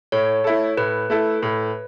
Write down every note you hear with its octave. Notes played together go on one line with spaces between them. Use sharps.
A2 C#5
A3 E4 A4
A2 B4
A3 E4 A4
A2